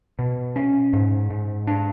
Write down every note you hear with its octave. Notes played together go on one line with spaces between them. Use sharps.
B2
C#4
G#2
G#2
D4